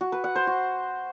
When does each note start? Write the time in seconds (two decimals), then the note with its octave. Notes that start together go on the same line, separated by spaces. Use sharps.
0.01 F#4
0.12 B4
0.24 F#5
0.35 C5
0.47 F#4